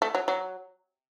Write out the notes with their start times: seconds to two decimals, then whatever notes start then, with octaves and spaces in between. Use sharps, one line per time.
0.02 A3
0.15 F#3
0.28 F#3